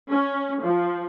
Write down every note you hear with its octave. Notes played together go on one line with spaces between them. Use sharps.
C#4
F3